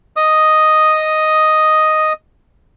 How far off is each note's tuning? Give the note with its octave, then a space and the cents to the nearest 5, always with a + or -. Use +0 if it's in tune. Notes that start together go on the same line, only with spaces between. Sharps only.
D#5 +0 D#6 +0